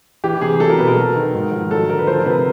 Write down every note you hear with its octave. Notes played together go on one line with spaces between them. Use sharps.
E3 G4
C3 G#4
F#3 A4
A#4
B2 B4
A#4
F#3
D#3
G#2
F3
F#3 A4
D3 A#4
B4
F3 C5
A#4
C3 B4